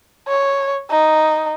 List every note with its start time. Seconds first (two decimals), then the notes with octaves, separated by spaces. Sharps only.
0.28 C#5
0.90 D#4